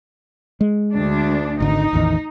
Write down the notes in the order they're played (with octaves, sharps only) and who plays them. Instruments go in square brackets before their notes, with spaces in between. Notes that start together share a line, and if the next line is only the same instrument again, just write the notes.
[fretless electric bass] G#3
[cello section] D2 D4
[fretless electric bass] G#1 D3 [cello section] D#4
[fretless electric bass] A1 E2 D#3